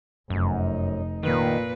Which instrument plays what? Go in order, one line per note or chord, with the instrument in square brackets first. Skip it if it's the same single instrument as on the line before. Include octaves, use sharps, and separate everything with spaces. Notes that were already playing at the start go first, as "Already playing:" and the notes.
[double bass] F1 D#4 [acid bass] F#2
[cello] A#2 B4 [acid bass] D#3